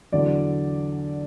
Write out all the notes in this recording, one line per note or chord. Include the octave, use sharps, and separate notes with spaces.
E2 D3 F#3 D5